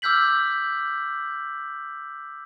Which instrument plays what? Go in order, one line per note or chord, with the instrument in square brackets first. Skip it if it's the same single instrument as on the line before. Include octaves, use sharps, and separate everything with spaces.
[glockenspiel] D6 E6 F6 G6 B6 F#7